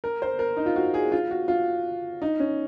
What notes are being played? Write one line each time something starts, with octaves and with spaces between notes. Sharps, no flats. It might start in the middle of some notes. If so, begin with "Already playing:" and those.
A#4
C5
A#4
D#4
F4
F#4
G#4
F4
F#4
F4
D#4
C#4